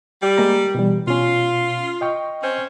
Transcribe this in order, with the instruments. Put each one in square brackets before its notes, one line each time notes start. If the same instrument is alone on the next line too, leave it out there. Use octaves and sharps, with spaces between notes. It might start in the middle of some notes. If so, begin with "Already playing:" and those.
[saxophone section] G3
[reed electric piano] G#3 A#3 A#5
B2 E3 G3
[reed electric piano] B2 C#4 [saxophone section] F4
[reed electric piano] D#5 G5 C#6
[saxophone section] C4 C#4 C5